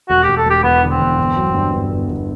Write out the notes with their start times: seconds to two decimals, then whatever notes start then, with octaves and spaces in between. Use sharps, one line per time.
0.09 E1 F#4
0.23 G4
0.28 E1
0.37 A4
0.45 E1
0.51 G4
0.63 E2 B3
0.83 D3
0.91 C4
1.00 E2
1.18 G1
1.36 F#3
1.54 G2
1.72 G2
1.90 G1
2.08 G1